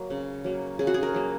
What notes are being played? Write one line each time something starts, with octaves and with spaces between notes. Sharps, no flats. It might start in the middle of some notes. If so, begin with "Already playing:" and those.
Already playing: F#3 A#3
C#3
F#3 A#3
C#3 G#4
F#4
G#4
A#4
F#3 A#3